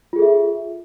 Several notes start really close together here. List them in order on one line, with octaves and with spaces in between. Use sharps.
F4 G#4 A4 E5